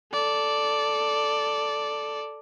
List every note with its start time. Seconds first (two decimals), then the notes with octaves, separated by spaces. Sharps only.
0.14 A4 D5